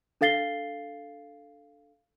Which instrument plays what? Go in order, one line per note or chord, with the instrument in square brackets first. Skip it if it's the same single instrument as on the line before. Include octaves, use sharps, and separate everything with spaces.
[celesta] D4 A4 F5 A6 C7 G7